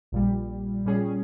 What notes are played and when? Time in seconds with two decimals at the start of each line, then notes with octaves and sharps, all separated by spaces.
0.12 A#1 A#2 G3
0.86 A#2 G3 C#4 G#4